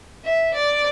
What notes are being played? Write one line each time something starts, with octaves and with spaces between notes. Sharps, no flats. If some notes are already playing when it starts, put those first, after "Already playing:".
E5
D5